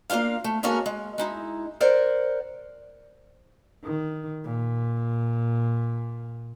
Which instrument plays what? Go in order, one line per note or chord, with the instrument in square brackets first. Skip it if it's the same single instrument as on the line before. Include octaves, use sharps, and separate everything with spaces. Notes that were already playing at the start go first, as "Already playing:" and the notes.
[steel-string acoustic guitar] A#3 C4 D4 F4 F5
A3
G#3 A#3 C#4 F#4 A4 A#4
G#3
G#3 D#4 E4
A#4 C5 D5 F#5
[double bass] D#3
A#2